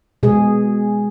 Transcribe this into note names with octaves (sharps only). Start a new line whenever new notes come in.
B2 G#3 G#4